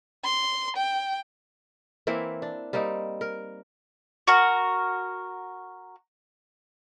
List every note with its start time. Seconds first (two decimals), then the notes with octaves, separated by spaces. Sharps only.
0.25 C6
0.77 G5
2.07 E3 A#3 C4 E4
2.42 D4
2.73 G3 A#3 C4 D#4
3.21 A#4
4.27 F#4 A#4